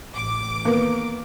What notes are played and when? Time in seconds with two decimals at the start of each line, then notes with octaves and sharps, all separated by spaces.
0.14 A1 D6
0.65 D#3 A#3 B3